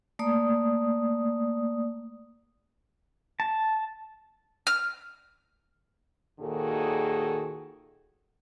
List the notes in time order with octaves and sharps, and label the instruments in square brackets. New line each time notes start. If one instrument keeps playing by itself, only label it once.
[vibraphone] A3 A#3 D5 D#6
[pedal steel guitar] A5
[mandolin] F6
[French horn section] D#2 A#2 D#3 F#4 G#4 A4